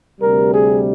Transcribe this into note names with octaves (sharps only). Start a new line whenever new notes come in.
D2 C3 G3 A#4
G#4